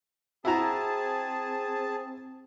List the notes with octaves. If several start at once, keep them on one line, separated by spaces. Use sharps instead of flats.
C4 E4 F#4 G#4 A5 A#5